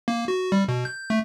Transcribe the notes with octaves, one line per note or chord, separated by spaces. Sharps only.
A#3
F#4
G3
B2
G6
A3